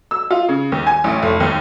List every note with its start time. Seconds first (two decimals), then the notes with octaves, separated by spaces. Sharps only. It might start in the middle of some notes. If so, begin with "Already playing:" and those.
0.11 E6
0.31 F4
0.49 C#3
0.72 D#2
0.87 G#5
1.04 A1
1.22 F1
1.40 D#2